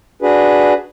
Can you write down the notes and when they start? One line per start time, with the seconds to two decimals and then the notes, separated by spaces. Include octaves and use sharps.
0.22 D4 F#4 G#4 B4